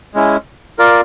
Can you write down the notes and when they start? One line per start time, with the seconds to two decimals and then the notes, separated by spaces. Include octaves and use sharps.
0.14 G#3 C#4 E4
0.79 F4 A#4 D5 F5